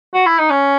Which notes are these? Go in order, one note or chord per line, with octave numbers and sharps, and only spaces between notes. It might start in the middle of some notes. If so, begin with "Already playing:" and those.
F#4
E4
D#4
C#4